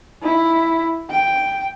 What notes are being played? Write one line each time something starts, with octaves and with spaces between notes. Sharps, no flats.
E4
G5